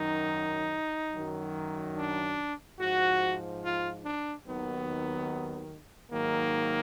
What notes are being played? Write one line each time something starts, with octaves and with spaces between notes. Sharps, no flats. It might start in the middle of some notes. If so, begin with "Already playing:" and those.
Already playing: F#2 D#3 F#3 D#4
F#2 D#3 F#3
D4
G#2 F3 F#4
F4
D4
D#2 D#3 F#3 B3
G#2 D#3 F#3 A#3